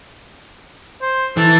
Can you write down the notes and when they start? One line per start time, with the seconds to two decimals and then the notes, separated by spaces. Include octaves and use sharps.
1.02 C5
1.37 E3 A4